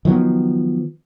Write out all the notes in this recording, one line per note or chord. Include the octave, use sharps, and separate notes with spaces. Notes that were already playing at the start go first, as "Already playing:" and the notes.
D#3 F3 F#3 B3